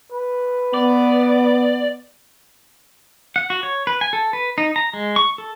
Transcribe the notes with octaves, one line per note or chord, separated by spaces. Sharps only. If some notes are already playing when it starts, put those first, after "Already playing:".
B4
B3 D5
F#5
F#4
C#5
B4
G#5
A4
B4
D#4
A#5
G#3
C#6
A4